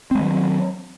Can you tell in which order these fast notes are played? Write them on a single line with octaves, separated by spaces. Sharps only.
C4 G#3 D#3 F#3